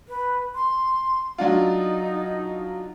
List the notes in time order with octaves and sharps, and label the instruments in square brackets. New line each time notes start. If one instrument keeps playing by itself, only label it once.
[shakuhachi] B4
C6
[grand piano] F#3 D4 F4 [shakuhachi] D#4